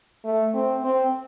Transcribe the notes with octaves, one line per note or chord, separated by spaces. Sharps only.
A3
C4
C4